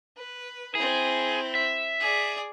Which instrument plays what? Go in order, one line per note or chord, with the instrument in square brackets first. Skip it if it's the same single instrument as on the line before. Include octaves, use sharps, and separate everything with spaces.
[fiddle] B4
[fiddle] C4 E4 [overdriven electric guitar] G#4
[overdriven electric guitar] E5
[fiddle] G#4 D5